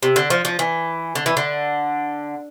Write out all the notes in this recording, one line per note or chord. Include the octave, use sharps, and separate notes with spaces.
C3
D3
F3
F3
E3
D3
E3
D3